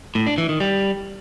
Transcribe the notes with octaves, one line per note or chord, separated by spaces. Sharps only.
A2
D4
E3
D#3
G3